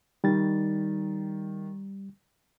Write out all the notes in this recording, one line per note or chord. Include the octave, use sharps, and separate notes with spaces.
D#3 G3 A6